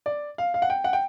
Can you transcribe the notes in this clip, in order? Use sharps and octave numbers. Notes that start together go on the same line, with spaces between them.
D5
F5
F5
F#5
G5
F#5
G5